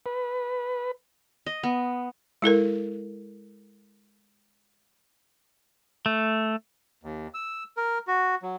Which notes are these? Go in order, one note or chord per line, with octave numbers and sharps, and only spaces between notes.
B4
D#5
B3
G#3 E4 A4 A#4
A3
D#2
E6
A#4
F#4
F#3